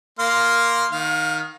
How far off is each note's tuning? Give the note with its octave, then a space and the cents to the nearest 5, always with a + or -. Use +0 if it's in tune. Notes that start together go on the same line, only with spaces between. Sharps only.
A#3 +0 F5 +0 C6 +0
D#3 +0 F5 +30